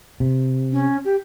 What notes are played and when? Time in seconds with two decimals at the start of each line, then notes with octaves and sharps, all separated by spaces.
0.20 C3
0.72 C#4
1.05 G4